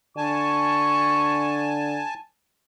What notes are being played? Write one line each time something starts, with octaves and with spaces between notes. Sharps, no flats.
D3 G#5 A5 C#6